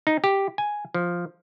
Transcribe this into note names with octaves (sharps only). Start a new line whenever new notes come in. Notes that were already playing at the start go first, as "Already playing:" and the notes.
D#4
G4
G#5
F3